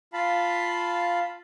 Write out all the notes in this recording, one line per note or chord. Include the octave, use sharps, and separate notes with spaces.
F4 F5 A5 B5